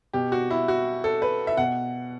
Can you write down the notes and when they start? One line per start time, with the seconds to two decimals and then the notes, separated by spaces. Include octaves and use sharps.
0.13 B2 G4
0.32 F#4
0.51 E4
0.68 F#4
1.04 A4
1.22 B4
1.47 E5
1.57 B2 F#5